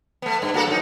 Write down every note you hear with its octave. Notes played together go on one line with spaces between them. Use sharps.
A3 B3
G2
A#3 F#4 A4
F#2 D#4